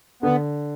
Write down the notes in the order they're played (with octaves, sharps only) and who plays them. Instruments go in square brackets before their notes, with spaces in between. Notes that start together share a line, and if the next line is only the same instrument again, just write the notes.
[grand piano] D3 [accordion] B3